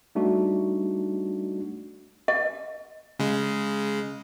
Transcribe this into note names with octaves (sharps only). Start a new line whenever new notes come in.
G3 A3 D4 D#4 F#4
D#5
C#3 G#3